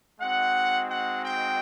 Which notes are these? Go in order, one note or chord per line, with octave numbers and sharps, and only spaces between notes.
G#3 C4 D#4 F#4 F#5
F#5
G5